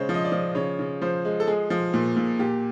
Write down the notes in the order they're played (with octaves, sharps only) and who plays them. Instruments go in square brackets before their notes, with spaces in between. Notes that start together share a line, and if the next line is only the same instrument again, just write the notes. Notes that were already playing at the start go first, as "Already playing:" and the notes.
Already playing: [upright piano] C#3 G#3 C5 C#5
F3
D#5
D5
F3
C#3 C#5
C#3
F3 C5
G#3
A4
G#3 G#4
F3
A#2
A#2
A#2 G4